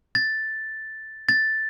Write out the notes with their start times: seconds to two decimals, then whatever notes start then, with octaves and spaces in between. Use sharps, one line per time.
0.15 A6
1.29 A6